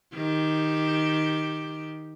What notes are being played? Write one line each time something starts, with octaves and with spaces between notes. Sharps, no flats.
D#3 G4